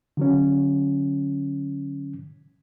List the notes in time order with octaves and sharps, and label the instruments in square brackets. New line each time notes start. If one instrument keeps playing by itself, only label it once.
[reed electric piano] D3 F#3 C#4